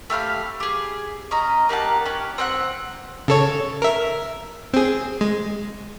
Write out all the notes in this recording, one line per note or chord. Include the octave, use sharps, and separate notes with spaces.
A3 G4 F5 B5
G4 G#4
C#4 D#5 A#5
A#3 G4 F#5 A5
C#4 G4 F#5
C4 E5 F#5 F#6
C#3 A4 C#5
A#4 E5
C4 G#4
G#3